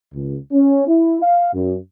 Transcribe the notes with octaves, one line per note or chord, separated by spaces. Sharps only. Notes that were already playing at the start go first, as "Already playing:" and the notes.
C#2
C#4
E4
F5
F#2